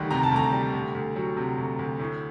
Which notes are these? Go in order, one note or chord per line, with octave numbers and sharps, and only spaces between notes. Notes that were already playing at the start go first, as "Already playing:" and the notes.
Already playing: D2 D#3 G3 F#6
C3 A#5
A5
D2 A#5
G3
D2
D2
F#3
C3
D2
D2
A2